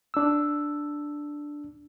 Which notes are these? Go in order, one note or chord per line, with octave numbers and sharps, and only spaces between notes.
D4 E6